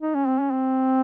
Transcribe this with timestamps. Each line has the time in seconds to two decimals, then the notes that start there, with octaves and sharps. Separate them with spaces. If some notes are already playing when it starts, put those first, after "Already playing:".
0.01 D#4
0.14 C#4
0.27 C4
0.39 C#4
0.51 C4